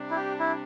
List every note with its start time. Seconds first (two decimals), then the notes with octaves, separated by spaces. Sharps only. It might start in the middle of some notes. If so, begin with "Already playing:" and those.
Already playing: C3 G3 D4
0.11 E4
0.16 G4
0.39 E4